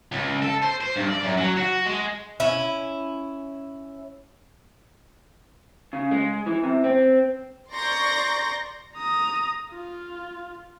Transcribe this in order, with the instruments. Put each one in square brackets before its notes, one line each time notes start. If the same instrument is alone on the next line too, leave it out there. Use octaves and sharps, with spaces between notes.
[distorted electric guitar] C#2
A4
C5
C5
G2
D5
F#2
F#3
F#4
G#3
[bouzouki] C#4 E4
[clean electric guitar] C#3
G#3
E3
C3
C4
[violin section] D5 A#5 C6 C#6 G6 A#6
[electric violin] A#5 D#6
F4